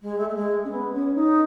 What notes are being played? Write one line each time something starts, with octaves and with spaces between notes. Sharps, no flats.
G#3
A3
A3
G#3
C#4
B3
C#4
D#4